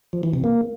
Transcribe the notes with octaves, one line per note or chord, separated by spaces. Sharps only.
F3
E3
C3
A#3